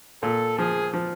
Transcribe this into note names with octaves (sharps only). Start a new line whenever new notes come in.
A#2 A4
F3 G#4
F3